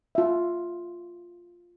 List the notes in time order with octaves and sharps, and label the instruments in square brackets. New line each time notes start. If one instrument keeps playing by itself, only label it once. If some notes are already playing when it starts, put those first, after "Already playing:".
[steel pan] F4 E5